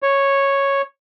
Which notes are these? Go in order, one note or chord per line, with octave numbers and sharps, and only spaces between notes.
C#5